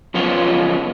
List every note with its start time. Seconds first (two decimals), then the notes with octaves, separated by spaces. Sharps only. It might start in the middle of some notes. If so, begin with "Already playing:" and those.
0.14 F#2 F3 B3 C#4 F4